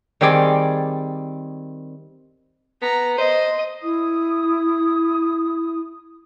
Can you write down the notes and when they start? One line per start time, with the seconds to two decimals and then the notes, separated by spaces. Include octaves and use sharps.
0.21 D#3 G3 C4 G#4 D5
2.82 B3 A#5
3.18 C5 D#5
3.82 E4 D#6